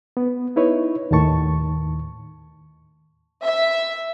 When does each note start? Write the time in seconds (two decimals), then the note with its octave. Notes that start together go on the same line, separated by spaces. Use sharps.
0.17 B3
0.56 D#4 E4 B4 C#5
1.11 D#2 A2 D#3 A5 C#6
3.42 E5